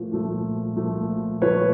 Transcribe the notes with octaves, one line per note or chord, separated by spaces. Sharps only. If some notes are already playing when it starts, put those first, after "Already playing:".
Already playing: A#2 F3 A3
A#2 F3 A3
A#2 F3 A3
A#2 F3 A3 B4 C#5